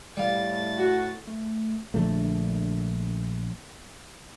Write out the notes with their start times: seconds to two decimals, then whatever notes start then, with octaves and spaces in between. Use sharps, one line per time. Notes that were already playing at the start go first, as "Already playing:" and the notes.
0.17 A2 G3 A3 F5 A6
0.78 F#4
1.27 A3
1.94 A#1 D3 F3 A3